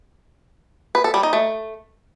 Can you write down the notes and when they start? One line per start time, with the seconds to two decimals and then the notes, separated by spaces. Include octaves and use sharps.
0.95 B4
1.04 A4
1.14 G3
1.23 D#4
1.33 A3